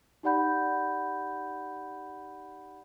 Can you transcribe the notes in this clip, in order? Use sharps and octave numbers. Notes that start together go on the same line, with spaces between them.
D#4 G4 D5 F#5 B5 G6